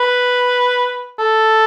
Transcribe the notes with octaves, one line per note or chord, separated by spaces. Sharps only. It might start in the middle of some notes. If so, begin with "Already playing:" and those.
Already playing: B4
A4